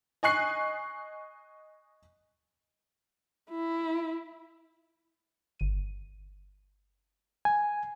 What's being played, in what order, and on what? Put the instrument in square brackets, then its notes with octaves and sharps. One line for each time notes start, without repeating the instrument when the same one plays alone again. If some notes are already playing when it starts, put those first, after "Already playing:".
[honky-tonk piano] D#5 G#5 C#6 F#6 C7
[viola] E4
[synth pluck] G1 D#7
[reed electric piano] G#5